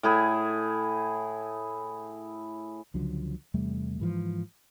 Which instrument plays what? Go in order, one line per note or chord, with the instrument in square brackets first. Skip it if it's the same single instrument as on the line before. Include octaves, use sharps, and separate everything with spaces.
[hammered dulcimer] A2 E4 G#4
[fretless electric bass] C#2 D3 F3 F#3
E2 C3 G3 A3
G#2 E3 F3